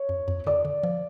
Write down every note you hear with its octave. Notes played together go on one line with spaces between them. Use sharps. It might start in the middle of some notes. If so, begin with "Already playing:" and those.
Already playing: C#5
F2
F2
D3 D5
D3
F3